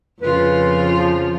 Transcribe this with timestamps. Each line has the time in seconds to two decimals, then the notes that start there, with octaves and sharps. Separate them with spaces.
0.21 F2 C#3 F4 B4
0.96 F3